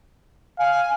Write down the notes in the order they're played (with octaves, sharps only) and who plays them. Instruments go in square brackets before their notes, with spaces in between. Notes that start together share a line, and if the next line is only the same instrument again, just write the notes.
[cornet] F5 [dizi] G#5